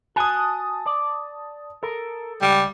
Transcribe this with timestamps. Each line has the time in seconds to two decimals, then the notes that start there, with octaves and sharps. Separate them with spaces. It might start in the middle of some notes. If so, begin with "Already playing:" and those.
0.16 F#4 G#5 A5 D#6
0.86 D5
1.83 A4 A#4
2.42 C#2 G3